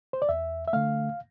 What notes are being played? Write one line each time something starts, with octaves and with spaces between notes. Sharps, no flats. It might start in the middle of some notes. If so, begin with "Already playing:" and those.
C5
D5
E2 E5
E5
D3 A3 F5